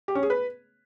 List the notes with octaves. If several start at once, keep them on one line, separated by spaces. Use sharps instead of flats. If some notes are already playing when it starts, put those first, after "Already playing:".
G4
C#4
G#4
B4